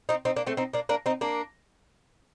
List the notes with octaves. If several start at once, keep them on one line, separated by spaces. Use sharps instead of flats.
C4 D#4
C4 D#4
A#3 D4
A3 C4
C4 D#4
A#3 D4
A#3 D4
C4 D#4
A#3 D4